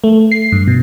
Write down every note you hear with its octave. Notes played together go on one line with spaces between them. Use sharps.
A3
C7
G2
B2